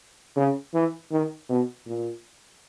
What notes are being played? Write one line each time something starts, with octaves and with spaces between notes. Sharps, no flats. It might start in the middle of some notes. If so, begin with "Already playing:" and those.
C#3
E3
D#3
B2
A#2